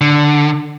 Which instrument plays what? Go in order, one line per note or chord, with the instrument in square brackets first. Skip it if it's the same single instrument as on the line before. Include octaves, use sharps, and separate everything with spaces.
[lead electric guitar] D3